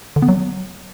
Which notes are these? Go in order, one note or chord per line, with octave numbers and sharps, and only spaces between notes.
D3
B3
F#3